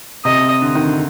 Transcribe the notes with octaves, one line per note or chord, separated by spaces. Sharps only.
C3 D#5
D3
D#3
D3